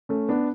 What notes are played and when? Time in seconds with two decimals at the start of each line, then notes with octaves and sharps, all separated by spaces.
0.09 A3 C#4
0.29 B3 D4